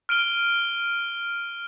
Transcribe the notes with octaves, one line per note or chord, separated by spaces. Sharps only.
F6 D7 D#7 G7